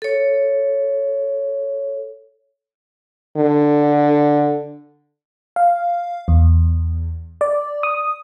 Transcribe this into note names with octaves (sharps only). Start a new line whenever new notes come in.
A4 C#5
D3
F5
E2
D5
D#6